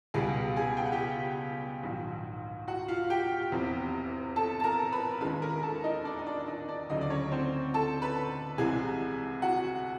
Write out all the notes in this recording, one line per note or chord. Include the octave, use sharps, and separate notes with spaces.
C#2 B2 G3 B3 G#4 G#5
G#4 G#5
G5
F#5
G4 G5
A#1 G#2 D#3 F#3
F#4 F#5
F4 F5
G4 G5
F1 E2 C3
A4 A5
A5
A#4 A#5
B4 B5
D#2 D#3 G#3 C#4 B4 B5
A#4 A#5
A4 A5
D#4 D#5
D4 D5
D#5
D4 D5
D#4 D#5
D4 D5
D2 C#3 F#3 A3 D#4 D#5
D5
C#4 C#5
C4 C5
A4 A5
B4 B5
C2 C3 E3 G#3 G#4 G#5
F#4 F#5